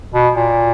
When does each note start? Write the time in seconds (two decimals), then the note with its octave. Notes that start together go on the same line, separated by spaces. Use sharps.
0.14 B2
0.35 A#2